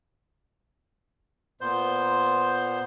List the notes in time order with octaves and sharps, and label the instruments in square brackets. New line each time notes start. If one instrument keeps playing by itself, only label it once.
[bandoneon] A#2 B3 C5 G6